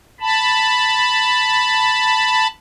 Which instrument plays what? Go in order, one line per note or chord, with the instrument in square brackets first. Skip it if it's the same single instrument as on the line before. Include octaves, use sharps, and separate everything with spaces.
[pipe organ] A5 B5